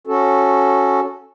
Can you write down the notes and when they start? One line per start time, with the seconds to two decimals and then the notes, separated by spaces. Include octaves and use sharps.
0.07 C#4 F#4 A4